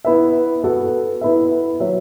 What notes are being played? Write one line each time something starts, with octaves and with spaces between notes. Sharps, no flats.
B3 E4 B4 E5
B3 F#4 A4
B3 E4 B4 E5
F#3 B3 F#4 C#5 E5